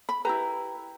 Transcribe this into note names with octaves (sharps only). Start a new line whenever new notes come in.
B5
E4 G4 B4 A#5